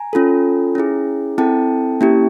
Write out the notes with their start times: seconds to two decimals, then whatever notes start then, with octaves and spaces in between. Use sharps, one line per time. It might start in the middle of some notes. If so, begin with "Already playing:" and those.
Already playing: G#5 A#5
0.13 C#4 F4 A4
0.75 C#4 E4 G#4
1.38 C4 E4 A4 G5 A5
2.01 A#3 C#4 E4 G4